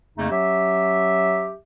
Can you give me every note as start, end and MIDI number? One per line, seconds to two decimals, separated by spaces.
0.18 0.29 41
0.18 0.29 49
0.18 0.29 57
0.18 0.29 58
0.18 0.29 63
0.31 1.53 54
0.31 1.53 61
0.31 1.53 67
0.31 1.53 76